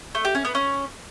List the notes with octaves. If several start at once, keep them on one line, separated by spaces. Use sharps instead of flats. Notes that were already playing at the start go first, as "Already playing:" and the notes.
A3
G4
C#4
B3
C#4